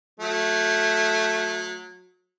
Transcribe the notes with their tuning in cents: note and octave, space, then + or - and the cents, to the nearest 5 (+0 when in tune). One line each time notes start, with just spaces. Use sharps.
F#3 -30 A3 +0